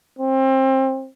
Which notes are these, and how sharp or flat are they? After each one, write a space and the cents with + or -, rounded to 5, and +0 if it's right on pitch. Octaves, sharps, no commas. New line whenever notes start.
C4 +25